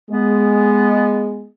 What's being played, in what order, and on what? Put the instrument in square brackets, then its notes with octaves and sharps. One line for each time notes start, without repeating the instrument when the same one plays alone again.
[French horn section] G#3 [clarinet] B3